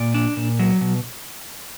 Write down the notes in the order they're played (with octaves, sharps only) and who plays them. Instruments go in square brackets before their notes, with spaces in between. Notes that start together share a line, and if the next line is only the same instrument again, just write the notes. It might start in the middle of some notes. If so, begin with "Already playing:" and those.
Already playing: [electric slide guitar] A#2 D5
D4
A#2
F#3
B2